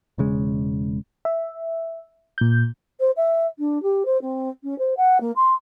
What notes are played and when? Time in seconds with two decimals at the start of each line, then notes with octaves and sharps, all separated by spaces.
0.18 E1 C#3 G#3
1.25 E5
2.38 A#2 G6
3.00 C5
3.17 E5
3.59 D4
3.83 G4
4.05 C5
4.22 C4
4.64 C#4
4.79 C5
4.97 F#5
5.21 A#3
5.36 C6